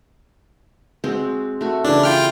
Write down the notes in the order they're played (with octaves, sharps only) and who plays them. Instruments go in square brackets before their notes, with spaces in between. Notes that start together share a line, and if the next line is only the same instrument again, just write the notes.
[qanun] G#3 C4 F#4
A3 F#4
[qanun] C#3 E3 E4 [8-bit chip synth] D4
[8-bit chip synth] F4 G5 F6